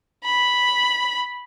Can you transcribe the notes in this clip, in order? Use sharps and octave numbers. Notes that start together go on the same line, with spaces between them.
B5